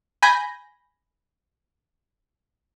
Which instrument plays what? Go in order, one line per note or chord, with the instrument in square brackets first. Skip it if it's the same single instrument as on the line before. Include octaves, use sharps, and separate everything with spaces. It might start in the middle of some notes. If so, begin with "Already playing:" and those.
[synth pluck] G#5 B5 G6 A#6